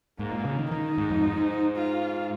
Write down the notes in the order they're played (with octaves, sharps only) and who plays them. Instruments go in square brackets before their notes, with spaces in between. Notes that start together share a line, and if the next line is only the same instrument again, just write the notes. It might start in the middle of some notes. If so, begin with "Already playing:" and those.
[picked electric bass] G#2 [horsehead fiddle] A#3
[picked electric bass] A#2
C#3
D#3
[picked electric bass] D#3 [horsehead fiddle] D#4
[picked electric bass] G#2
F2
G#2
[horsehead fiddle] F4